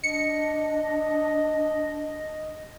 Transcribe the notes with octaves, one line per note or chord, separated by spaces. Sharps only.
D4 D#5 C#7